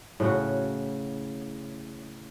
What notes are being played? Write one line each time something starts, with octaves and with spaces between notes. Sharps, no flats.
A2 C#3 F#4